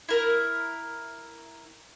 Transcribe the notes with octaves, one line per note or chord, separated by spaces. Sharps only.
E4 A#4